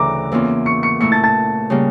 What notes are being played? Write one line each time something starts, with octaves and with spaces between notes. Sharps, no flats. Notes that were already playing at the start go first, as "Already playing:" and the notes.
Already playing: D2 C#3 E3 A#5 D6
E2 E3 A#3 C#4 F4
C#6 C#7
C#6 C#7
A#2 A3 E4 C#6 C#7
A5 A6
A5 A6
C#3 G3 A#3